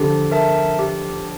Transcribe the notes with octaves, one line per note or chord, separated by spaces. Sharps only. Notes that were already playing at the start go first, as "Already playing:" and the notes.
Already playing: D3 F3 G4
A#4 E5 A5
G4